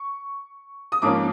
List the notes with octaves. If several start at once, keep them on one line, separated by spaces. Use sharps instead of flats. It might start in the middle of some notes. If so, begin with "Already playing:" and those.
Already playing: C#6
D#6
G#2 F3 A#3 C#4 D6